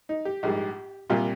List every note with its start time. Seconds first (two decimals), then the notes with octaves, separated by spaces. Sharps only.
0.09 D#4
0.25 G4
0.43 A#1 G#2 G3
1.10 C2 A#2 G3 F4